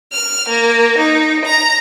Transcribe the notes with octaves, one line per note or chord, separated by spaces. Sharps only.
F6
A#3
D#4
A#5